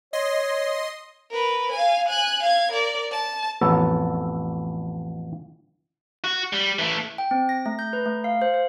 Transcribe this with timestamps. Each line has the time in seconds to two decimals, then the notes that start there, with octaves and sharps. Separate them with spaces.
0.13 C#5 D#5 C6
1.31 A#4 B4
1.72 F5 G#5
2.08 G#5 F#6
2.43 F5 G#6
2.72 A#4 D5
3.11 A5
3.61 A1 F2 B3 A4 C#5
6.24 F#4
6.53 G3
6.79 E3 A3
7.18 G5
7.31 C4
7.49 A#6
7.66 A3
7.79 G6
7.93 B4
8.06 A3
8.24 F5
8.42 C5
8.54 C5